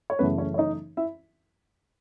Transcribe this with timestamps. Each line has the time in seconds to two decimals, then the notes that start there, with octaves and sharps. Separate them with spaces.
0.10 C#5
0.19 F#2 C#3 E3 A3 B3 B4
0.38 C#4 C#5
0.54 C#5
0.58 D#4 D#5
0.97 E4 E5